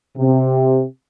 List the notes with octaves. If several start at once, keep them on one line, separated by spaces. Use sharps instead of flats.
C3